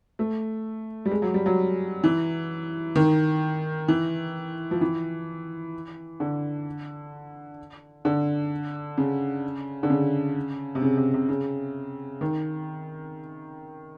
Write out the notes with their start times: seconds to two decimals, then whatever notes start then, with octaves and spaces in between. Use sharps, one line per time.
0.19 A3
1.05 G3
1.11 G#3
1.22 F#3
1.34 G3
1.46 F#3
2.04 E3
2.96 D#3
3.88 E3
4.71 F3
4.81 E3
6.20 D3
8.05 D3
8.98 C#3
9.83 D3
9.90 C#3
10.75 C3
10.82 C#3
10.97 C3
11.14 C3
11.29 C#3
12.21 D#3